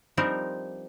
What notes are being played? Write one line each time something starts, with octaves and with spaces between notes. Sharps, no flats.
F3 G3 C4 D4 D#4 A#4